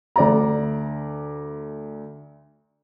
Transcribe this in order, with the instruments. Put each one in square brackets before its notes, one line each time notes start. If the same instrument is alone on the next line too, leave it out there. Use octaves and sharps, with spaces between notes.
[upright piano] D2 D5 A#5